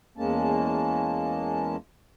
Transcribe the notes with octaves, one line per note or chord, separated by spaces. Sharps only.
E2 G#3 A#3 C#4 A5